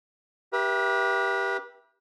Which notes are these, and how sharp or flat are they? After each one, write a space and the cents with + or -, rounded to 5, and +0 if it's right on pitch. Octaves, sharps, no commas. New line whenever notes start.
G4 +0 B4 -40 E5 +10